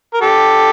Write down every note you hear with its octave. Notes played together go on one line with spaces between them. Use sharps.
A#4
G4 A4